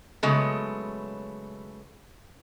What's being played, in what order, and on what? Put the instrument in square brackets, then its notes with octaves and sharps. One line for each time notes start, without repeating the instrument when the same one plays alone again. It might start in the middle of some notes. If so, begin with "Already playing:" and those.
[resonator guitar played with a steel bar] C#3 F#3 G#3 A3 B3